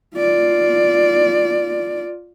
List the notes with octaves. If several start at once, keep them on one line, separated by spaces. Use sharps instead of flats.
F4 D5